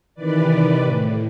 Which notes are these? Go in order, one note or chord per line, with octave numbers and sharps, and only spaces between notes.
C3 D#3 E3 B4 D5
A2